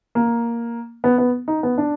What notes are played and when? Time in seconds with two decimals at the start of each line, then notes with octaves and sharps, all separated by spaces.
0.15 A#3
1.04 B3
1.18 B3
1.48 D#4
1.63 B3
1.78 D4